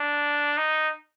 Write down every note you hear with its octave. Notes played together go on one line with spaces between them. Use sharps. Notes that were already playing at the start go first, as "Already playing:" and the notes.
Already playing: D4
D#4